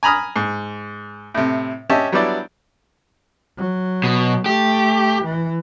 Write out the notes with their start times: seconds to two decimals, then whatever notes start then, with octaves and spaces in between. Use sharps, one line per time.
0.03 G#5 A#5 B5 D#6 F6
0.36 G#2
1.34 A2 C3
1.90 C#4 G4 D#5 E5 A5
2.12 F#3 G3 B3 D4 E4 D5
3.57 F#3
4.04 B2
4.46 A3 G4
5.24 E3